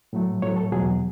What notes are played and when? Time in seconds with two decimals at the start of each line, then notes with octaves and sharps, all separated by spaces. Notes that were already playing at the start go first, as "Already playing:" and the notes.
0.13 A2 F#3 A3
0.42 A2 F#3 A3 C#5
0.57 A4
0.72 E2 B2 F#3 G#4